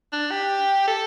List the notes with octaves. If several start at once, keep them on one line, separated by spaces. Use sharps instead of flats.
D4
G4
A4